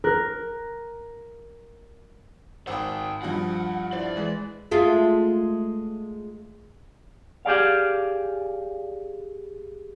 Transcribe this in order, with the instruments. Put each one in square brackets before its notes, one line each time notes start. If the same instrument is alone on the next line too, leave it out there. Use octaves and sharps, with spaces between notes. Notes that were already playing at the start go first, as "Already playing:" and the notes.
[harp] A#4 F#6
[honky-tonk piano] G#1 D#6 [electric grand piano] C5 E6 [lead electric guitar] F#5 G5
[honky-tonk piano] G2 F3 F#4 [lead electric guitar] F#5
[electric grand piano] E4 C5 [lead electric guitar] D5
[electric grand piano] E3 G#3
[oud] G#3 A3 F4
[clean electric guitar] G4 G#4 D5 F5